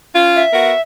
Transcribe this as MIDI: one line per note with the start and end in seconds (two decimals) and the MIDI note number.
0.15 0.43 61
0.15 0.43 65
0.36 0.81 76
0.53 0.73 59
0.53 0.73 66
0.53 0.73 70